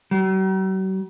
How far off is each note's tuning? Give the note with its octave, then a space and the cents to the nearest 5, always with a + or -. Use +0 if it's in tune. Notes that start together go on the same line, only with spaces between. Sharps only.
F#3 +45